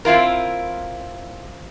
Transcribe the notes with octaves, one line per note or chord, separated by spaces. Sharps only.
C4 E4 F4 A#4